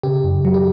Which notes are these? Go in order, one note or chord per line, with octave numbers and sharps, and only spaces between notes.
C#3 G4
F#2
F#3
G4